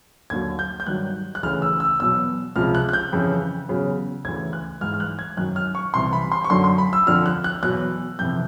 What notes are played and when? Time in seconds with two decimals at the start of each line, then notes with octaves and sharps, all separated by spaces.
0.30 D#2 D3 F#3 G#6
0.59 G6
0.80 G6
0.87 G2 D#3 F#3 F#6
1.35 F#6
1.43 D2 C#3 E3 F6
1.62 E6
1.80 E6
2.00 E2 B2 F#3 E6
2.56 C#2 C3 F3 F6
2.75 F#6
2.89 F#6
2.93 G6
3.12 F2 C#3 E3
3.68 E2 C#3 F#3
4.25 D2 C#3 E3 G#6
4.53 F#6
4.81 G#2 E3 F6
4.94 F6
5.00 F#6
5.19 G#6
5.37 F#2 D#3 F#3 F#6
5.56 F6
5.75 C#6
5.94 C2 C3 E3 C6
6.13 B5
6.32 C6
6.44 C#6
6.50 F#2 D3 F#3 C6
6.64 C6
6.78 B5
6.93 E6
7.06 F2 D3 F3 F6
7.26 F#6
7.44 F#6
7.63 E2 B2 F#3 F#6
8.19 F2 C3 E3 G6